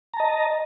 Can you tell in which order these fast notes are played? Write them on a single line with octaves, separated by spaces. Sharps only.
A#5 A5 D#5